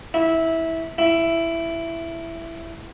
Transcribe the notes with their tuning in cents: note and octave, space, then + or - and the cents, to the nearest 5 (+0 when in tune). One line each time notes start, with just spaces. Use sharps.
E4 -15
E4 +10